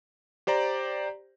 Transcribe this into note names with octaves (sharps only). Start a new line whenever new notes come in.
G4 C5 D5 A#5